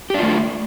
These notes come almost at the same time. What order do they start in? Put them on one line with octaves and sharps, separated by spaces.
G4 D4 F4 A3